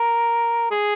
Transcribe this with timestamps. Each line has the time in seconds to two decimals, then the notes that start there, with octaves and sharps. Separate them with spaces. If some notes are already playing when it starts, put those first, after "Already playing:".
Already playing: A#4
0.71 G#4